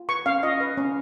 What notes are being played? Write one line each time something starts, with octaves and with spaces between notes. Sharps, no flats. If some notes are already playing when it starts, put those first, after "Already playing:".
Already playing: F4
B4 C#6
C#4 F5
F4 D#5
B4
C#4